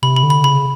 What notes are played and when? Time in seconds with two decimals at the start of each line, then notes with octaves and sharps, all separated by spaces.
0.02 C3 B5
0.16 B5
0.23 D3
0.30 B5
0.44 C#3 B5